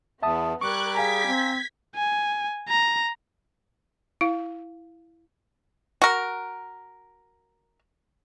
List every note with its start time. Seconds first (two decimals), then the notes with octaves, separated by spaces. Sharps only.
0.23 E2 B3 E5 A5 D#6
0.61 G3 A#4 C#6 D6 F#6 G#6
0.95 G#4 F5 G#5 A#5 G#6 B6
1.27 C4
1.96 G#5
2.69 A#5
4.21 E4 F5
6.02 F#4 A#4